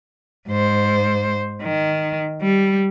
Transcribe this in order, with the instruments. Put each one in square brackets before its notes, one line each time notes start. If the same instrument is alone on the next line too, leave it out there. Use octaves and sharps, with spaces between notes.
[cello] G#2 C5
D#3
G3